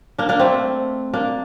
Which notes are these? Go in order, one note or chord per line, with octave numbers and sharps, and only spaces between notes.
A#3 D4
A#3 D4
A3 C4
A#3 D4